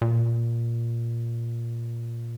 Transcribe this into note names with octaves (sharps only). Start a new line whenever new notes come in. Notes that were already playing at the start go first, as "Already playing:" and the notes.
A#2